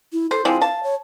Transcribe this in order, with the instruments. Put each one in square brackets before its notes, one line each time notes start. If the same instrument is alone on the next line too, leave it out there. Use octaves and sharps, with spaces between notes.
[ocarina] E4
[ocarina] A4 [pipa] C5
[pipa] F3 G#3 C4 [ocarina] E4
[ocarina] F5 [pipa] A5
[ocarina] C#5